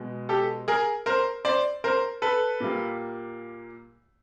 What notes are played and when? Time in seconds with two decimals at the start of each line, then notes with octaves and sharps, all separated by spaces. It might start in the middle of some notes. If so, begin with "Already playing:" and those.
Already playing: B2 G#3
0.29 G4 A4
0.68 G#4 A#4
1.06 A#4 C5
1.45 C5 D5
1.84 A#4 C5
2.22 A4 B4
2.60 A#2 G3 A#3